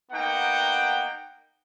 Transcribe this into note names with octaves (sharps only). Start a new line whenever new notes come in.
A#3 B3 D#4 F#5 G5